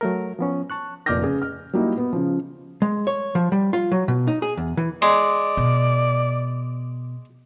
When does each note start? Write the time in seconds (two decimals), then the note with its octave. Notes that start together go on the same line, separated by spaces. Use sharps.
0.01 F#3 A3 A#4
0.39 F3 B3 C#4
0.70 A5 C#6 F#6
1.06 F1 A#2 D6 F6 G6 A#6
1.23 C#3 G#4
1.42 F6
1.73 F#3 G3 A#3 D#4 E4
1.98 B3
2.13 C#3 F3
2.82 G#3
3.07 C#5
3.35 F3
3.52 G3
3.73 F4
3.92 F#3
4.08 B2
4.27 D#4
4.42 G#4
4.57 E2
4.77 E3
5.02 G#3 D5
5.57 B2